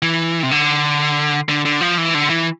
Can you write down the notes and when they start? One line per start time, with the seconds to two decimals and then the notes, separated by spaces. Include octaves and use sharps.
0.02 E3
0.43 C3
0.51 D3
1.49 D3
1.65 D3
1.81 F3
1.98 E3
2.14 D3
2.30 E3